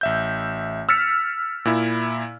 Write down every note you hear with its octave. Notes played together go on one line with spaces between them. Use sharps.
A1 E5 G6
E6 F6 A6 B6 C#7
A#2 E4